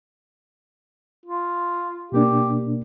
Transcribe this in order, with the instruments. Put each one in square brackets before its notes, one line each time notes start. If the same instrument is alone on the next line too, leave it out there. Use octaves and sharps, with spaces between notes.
[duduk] F4
[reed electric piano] B2 A#3 D4 [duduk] G4